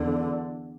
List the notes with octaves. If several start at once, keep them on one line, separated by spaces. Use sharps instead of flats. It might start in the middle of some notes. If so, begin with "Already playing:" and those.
Already playing: E2 D3